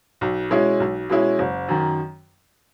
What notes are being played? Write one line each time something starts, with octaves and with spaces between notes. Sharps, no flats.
B1
B2 G#3 C#4 E4
B1
B2 G#3 C#4 E4
F#1
F#2 D#3